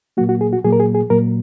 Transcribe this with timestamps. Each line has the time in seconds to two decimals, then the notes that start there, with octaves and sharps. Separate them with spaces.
0.17 A#2 F#3 A#3 F#4
0.29 F#4
0.41 G#4
0.53 F#4
0.64 A#2 F#3 A#3 G#4
0.72 A#4
0.80 G#4
0.95 G#4
1.10 A#2 F#3 A#3 A#4